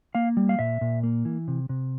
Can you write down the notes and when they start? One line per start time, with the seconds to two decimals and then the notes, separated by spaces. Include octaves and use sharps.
0.15 A#3 F5
0.37 G3
0.49 F5
0.59 A#2 E5
0.81 A#2
1.03 A#3
1.25 E3
1.48 C3
1.69 C3